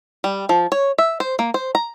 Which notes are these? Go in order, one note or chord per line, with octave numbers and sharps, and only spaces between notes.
G3
F3
C#5
E5
C5
A#3
C5
A#5